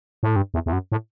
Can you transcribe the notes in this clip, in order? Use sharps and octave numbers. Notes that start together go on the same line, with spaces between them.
A2
G2
E2
E2
F#2
A2